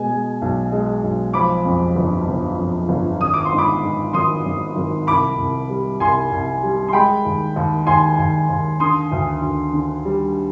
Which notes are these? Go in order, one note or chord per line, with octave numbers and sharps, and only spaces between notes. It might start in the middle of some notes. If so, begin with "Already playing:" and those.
Already playing: B2 G#3 G#5
G#3
B1
G#3
B1
F3 B5 D6
F2
G1
G1
F2
G1
G#1 D#6
D6
C6
G#2
B5 D6
G#2
G#1 C6 D#6
G#1
G#1
C2 B5 D6
C2
G3
C2 G#5 C6
C2
G3
C6
G#3 G5 B5
D#2
D#2
D#2 G#5 C6
D#2
D#2
D3 C6 D#6
D2
D2
D3
G3